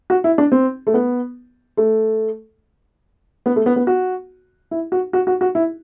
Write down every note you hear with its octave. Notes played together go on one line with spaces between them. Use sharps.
F#4
E4
D4
C4
A3
B3
A3
B3
A3
B3
B3
F#4
E4
F#4
F#4
F#4
F#4
E4